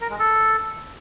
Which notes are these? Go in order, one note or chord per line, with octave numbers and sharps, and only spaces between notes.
A#4
G#3
A4